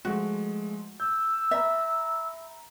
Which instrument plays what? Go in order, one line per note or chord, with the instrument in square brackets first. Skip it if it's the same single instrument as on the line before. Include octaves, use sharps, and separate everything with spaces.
[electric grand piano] F3 G#3 A3 [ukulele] F#4
[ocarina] E6 [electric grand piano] G6
[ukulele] E5 [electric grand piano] A#5 B5 A6